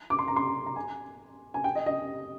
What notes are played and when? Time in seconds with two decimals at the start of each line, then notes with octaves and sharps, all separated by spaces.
0.10 D6
0.19 C6
0.28 A#5
0.36 C6
0.66 A#5
0.76 G#5
1.54 G#5
1.64 G5
1.75 D#5
1.86 D#5